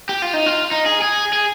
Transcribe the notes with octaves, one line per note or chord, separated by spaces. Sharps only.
G4
F4
D#4
F4
D#4
G#4
G#4
G#4